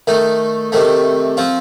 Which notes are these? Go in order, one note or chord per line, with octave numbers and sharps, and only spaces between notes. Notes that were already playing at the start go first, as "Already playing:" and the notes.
D#3 A3 D#4
C3 D#3 A3
F3 C4 F4